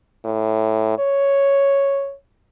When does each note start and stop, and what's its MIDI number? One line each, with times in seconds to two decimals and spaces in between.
0.25 0.98 45
0.99 2.14 73